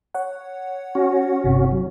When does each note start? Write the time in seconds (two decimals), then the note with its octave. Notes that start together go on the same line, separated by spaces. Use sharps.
0.14 C#5 F#5
0.95 C#4 F#4
1.44 G1 C3
1.72 F#3